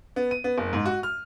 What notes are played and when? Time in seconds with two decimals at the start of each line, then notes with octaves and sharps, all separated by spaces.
0.16 B3
0.31 D#7
0.44 B3
0.58 F#1
0.73 G#2
0.86 F#4
1.03 F6